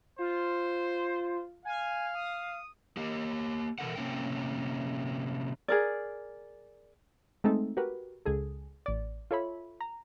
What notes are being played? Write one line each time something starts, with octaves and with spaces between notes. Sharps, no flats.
F4 C5
F5 G#5
D#6
A#3 G4
B2 E3 A4 A#4 F#5
C3 A#3 C#4 E4 G5
G#4 A#4 D5
G#3 A3 C4 D#4 A4
F#4 G4 A#4 B4
C#2 G#4 A4
A1 D5
F4 A4 C#5 E5 B5
A#5